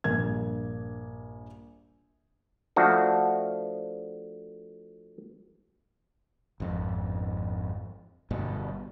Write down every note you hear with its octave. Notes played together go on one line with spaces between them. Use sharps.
A#1 G2 A#3 G#6
F3 A3 D4 F#4
G#1 F2
G1 G2 B2